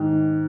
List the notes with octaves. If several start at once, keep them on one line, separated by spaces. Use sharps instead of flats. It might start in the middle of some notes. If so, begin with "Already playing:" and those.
Already playing: G#2 D#3